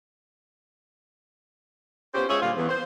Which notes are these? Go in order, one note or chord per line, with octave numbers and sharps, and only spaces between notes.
B3 C#4 F4 G4 C5
G#3 C#4 F4 G#4 C#5 E5
A#2 D3 G3 F4
E2
C5